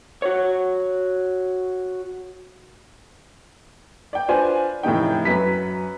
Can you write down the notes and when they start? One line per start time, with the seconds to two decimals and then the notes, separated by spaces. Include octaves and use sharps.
0.22 F#4 C#5
4.13 D5 G5
4.28 D4 F4 B4 C5 G#5
4.83 F1 A2 C#3 D#4 G5
5.25 F#2 F#3 B4 B6